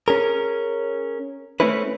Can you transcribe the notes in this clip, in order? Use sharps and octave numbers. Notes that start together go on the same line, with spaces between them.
C#4 G#4 A#4
A3 C4 C#4 E4 B4